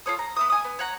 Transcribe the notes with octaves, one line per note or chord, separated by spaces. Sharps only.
F4 A4 C#5 D#6
A#5
B3 E5 D#6
G#5 D#6
B3
C#5 F#5 A#5